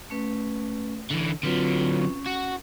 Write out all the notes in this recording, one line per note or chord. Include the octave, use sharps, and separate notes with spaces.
A3 C#4 B4
D3 E3
D3 F#3 C4 F4 B4
C#4
F#4